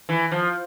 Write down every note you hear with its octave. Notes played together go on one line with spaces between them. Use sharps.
E3
F3